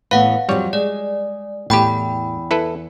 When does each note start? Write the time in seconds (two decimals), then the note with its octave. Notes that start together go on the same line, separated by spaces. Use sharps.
0.11 A2 E3 B3 B4 F5 F#5
0.49 F2 E3 F#3 G3 C#5
0.73 G#3 D5
1.70 E2 A2 G4 G5 B5
2.51 E4 A4 B4